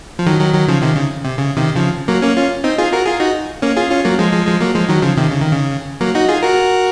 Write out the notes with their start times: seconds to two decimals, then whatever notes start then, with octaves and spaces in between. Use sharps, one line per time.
0.19 F3
0.26 D#3 F#3
0.40 D#3 F#3
0.54 D#3 F#3
0.68 C#3 F3
0.82 C3 D#3
0.96 C#3
1.24 C3
1.38 C#3
1.56 C3 D#3
1.75 C#3 F3
2.08 F#3 A#3
2.22 A#3 C#4
2.37 C#4 F4
2.64 C4 D#4
2.78 F4 G#4
2.93 F#4 A#4
3.06 F4 G#4
3.20 D#4 F#4
3.62 A#3 C#4
3.76 F4 G#4
3.90 C#4 F4
4.05 F#3 A#3
4.19 F3 G#3
4.33 F3 G#3
4.47 F3 G#3
4.61 F#3 A#3
4.74 F3 G#3
4.89 D#3 F#3
5.02 C#3 F3
5.17 C3 D#3
5.30 C#3
5.41 D#3
5.52 C#3
6.01 F#3 A#3
6.15 D#4 F#4
6.28 F4 G#4
6.43 F#4 A#4